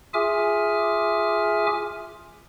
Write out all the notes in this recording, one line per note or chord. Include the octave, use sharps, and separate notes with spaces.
F4 G#4 E5 G#5 D6 F6